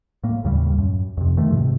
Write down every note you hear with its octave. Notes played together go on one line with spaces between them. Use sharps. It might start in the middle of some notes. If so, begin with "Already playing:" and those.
A2 A#3
D#2 A2 C#3 G3
F#2
F2 C3
D#3 F3 A3
G#2 C3